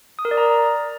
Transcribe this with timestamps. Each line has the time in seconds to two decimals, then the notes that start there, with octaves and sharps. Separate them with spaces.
0.19 D#6
0.25 A#4
0.31 D5
0.38 A#5